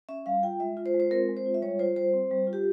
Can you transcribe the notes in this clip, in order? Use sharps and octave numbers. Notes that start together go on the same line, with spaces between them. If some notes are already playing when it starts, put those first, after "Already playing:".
C#4 E5
G3 F5
F4 G5
G#3 E5
F4
C5
G#3
C5
C4 A#4
G#3
C5
F4
E5
G3 C#5
F4 C5
G3 C5
C4
G3
F4
G4